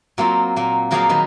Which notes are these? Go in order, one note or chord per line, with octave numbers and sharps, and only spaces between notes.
F#3 A#3 C4 F4
A#2 A#3
F3 F#3 A#3 G#4 D5 F5
D#3 F#3 B4